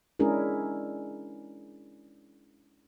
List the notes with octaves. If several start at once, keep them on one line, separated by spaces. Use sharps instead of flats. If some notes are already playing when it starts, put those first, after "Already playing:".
G#3 C#4 D4 E4 G#4 A#4